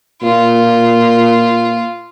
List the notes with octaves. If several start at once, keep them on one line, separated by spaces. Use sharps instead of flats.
A#2 F4